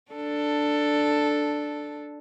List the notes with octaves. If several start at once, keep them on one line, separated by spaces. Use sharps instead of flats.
D4 A4